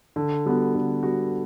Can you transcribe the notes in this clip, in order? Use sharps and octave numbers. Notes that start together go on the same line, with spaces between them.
D3
G3 B3 F#4
D3
G3 B3 F#4